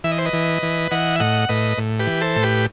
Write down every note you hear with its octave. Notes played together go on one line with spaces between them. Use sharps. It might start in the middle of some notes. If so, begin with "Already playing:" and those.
E3 E5
D#5
C5
B4 D#5
E3
E3
E3 D#5 F#5
E5
A2 D#5 F#5
A2 B4 D#5
A2
G4 B4
E3
A4 C5
A2
G4 B4